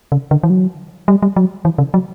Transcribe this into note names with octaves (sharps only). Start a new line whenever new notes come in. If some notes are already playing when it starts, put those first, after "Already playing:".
C#3
D3
E3
F#3
G3
G3
F#3
E3
C#3
F#3